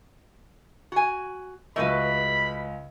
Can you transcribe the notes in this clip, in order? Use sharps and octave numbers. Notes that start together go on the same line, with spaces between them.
F#4 G#5
C#2 A3 F#4 B4 D#5 B5